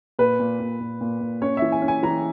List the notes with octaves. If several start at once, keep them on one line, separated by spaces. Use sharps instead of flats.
A#2 B4
A#2
A#2
A#2
A#2
A#2
C#4 C#5
E3 E5
G#5
C#4
G#5
E3 A#5